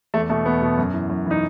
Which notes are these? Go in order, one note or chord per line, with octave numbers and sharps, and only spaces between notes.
E2 A3
B2 A3
E2 B3
B2
F#2
E3
F#2
E3 D#4